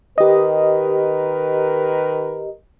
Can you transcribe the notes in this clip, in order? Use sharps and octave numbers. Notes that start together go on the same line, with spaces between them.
D#3 G4 A#4 B4 D#5